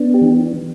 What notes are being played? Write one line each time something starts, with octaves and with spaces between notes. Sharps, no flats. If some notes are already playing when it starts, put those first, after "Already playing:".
Already playing: B3 D4
G4
E3